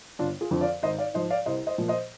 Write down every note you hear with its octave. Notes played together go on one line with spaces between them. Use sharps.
G1 D4 F4
F4 G#4
F2 D3 F3
D5 F5
G#1 C5 D#5
D5 F5
G#2 F3 C5 D#5
D5 F5
C2 C5 D#5
C5 D#5
A#2 F3
C5 D#5